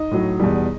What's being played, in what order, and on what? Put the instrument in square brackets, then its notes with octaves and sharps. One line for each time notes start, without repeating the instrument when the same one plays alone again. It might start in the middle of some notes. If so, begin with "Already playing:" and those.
Already playing: [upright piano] D#4 D#5
A2 F#3
E2 B2 G3